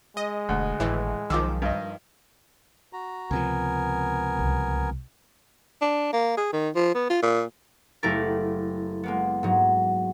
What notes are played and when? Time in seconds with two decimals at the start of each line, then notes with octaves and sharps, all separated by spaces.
0.17 G#3 D#5
0.49 E1 D2
0.80 G#1 A2 E3
1.30 B1 D#3 F3 D6 E6
1.62 G2 D#5
2.93 F#4 A#5
3.31 C#2 C3 F3 B3 A#4 G#5
4.39 C2
5.82 D4
6.13 A#3
6.37 G#4
6.53 D#3
6.75 F3
6.94 B3
7.09 F4
7.22 A#2
8.03 F#1 A3 E4 G4 A#4 A6
9.03 G#3 A#3 B3
9.43 G#2 F#3